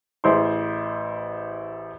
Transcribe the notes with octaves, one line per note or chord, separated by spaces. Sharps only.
A1 E4 G#4 C5 C6